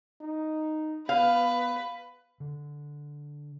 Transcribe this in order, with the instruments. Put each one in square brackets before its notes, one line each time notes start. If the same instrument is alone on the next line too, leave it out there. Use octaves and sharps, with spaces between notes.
[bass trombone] D#4
[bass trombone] B3 [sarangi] B4 [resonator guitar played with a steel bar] F5
[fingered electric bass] D3